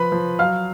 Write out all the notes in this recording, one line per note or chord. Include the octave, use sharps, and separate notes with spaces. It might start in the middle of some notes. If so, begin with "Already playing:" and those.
Already playing: F3 B4 B5
F3
F#3 F5 F6